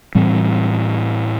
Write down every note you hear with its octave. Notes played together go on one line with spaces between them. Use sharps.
A2 E3 G3 C4